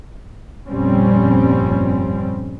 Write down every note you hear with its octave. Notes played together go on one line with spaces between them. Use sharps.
G1 F2 A#2 G3 C4 C#4